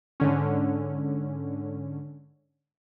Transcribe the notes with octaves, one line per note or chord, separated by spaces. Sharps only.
G#2 D3 C#4